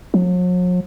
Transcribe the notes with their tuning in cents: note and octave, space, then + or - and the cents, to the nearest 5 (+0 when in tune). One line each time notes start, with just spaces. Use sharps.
F#3 -45